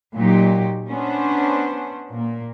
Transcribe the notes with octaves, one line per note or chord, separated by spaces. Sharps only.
A#2 F#3 D#4 G4
B3 C#4 D4 C5
A#2 A#3